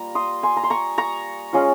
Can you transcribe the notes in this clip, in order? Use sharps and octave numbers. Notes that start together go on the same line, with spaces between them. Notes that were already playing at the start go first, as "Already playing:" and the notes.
Already playing: G3 A#3 F4 A#5
C6 D#6
G#5 C6
A#5
C6
A#5 C#6
A#5 C#6
G#3 C#4 F4